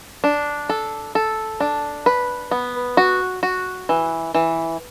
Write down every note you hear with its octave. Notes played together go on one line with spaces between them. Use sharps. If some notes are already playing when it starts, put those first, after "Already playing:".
D4
A4
A4
D4
B4
B3
F#4
F#4
E3
E3